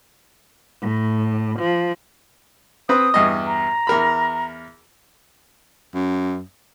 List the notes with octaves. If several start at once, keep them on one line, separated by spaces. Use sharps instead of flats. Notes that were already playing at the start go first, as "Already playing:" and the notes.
A2
F3
C4 B4 D#6
E2 G2 D#5
A#5
E2 A#4 B5
F#2